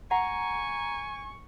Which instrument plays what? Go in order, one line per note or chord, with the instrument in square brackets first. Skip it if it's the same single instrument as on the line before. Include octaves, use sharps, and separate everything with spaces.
[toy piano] F#5 [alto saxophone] G#5 [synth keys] A#5 [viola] C#6